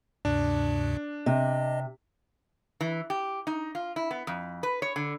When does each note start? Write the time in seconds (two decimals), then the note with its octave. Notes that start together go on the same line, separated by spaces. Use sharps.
0.25 D2 G2 C3 D4
1.26 C3 D#5
2.80 E3
3.10 G4
3.47 D#4
3.75 F4
3.96 E4
4.11 B3
4.27 F2
4.63 B4
4.82 C#5
4.96 D3